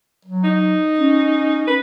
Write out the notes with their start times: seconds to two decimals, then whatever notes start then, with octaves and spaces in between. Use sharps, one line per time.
0.25 F#3
0.44 D#4
0.99 C#4
1.68 B4